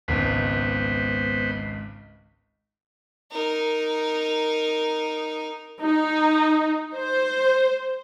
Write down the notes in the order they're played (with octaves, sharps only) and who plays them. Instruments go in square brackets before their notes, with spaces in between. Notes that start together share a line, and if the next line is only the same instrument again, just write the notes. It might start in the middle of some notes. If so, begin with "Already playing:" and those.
[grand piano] G#1 C#2 [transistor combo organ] B3 B4 C5
[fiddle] D#4 A#4
[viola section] D#4
C5